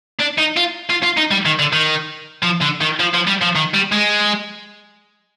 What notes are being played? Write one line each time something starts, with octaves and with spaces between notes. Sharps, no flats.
D4
D#4
F4
F4
F4
D#4
G3
D#3
D3
D#3
F3
D3
D#3
F3
F3
G3
F3
D#3
G3
G#3